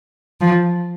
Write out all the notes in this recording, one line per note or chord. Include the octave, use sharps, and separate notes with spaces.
F3